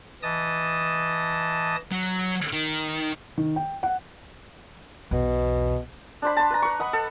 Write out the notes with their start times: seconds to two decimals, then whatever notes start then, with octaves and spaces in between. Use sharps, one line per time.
0.23 E3 D#5 A5 D#6
1.92 F#3
2.53 D#3
3.38 D#3
3.56 G5
3.83 F#5
5.11 B1 E2 B2
6.22 D4 C5 B5
6.36 A5 C6
6.51 B4 A#5
6.62 B4 C#6
6.79 D#5 F#5 B5
6.93 A4